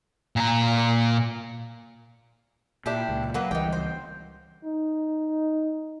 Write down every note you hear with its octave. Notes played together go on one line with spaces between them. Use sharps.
A#2 A#5
A#2 D4 E4 G4
C#2 A#2
F#3 A#3 B4
C#2 E3 G3 D#4 G5
C5
D#4